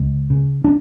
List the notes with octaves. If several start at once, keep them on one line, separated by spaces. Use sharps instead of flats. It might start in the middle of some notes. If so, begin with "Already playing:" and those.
Already playing: C#2
C#3
D4